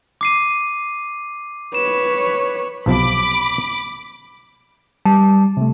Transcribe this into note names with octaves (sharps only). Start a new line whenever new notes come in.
D6 C7 D#7
B4 C#5 E7
B1 C3 F3 B5 D6
G3 A5
C3 A3